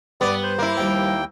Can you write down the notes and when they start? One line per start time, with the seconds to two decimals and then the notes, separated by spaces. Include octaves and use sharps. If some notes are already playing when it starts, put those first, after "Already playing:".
0.21 G2 G3 B3 D5 D6 D#6
0.43 C5
0.58 A#3 E4
0.77 D#2 F3 G3 G5